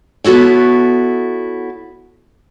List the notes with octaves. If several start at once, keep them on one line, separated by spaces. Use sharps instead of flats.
B3 E4 F#4 A4 C#5